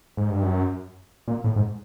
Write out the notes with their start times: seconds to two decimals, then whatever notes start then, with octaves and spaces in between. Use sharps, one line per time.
0.17 G#2
0.30 G2
0.42 F#2
1.28 A#2
1.44 A2
1.56 G#2